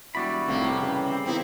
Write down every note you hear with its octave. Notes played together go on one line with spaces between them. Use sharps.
E1 G3 E4 F#4 D5 B5
F1 A2 C3 A#3
C#3 E3
C4
E2 A#3 C4 D#4 E4 G4